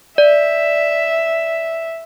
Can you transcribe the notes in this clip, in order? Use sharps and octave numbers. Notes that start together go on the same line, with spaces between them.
D5 E5